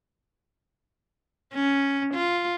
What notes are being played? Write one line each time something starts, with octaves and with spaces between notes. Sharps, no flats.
C#4
F4